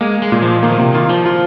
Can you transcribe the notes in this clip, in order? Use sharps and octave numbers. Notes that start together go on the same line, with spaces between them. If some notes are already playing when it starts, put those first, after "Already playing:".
G#3 A#3
G#3
A#2
F3
D#3 A#3
A#2
C3
D#3 F4
F3
F4